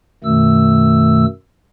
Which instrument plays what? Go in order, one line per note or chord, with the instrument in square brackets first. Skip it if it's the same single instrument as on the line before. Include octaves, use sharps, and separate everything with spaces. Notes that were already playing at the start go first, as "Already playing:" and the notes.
[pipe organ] F#2 B2 D#3 A3 E6